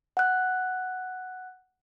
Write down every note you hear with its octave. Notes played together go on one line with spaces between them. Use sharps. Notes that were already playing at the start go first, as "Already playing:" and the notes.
F#5 F#6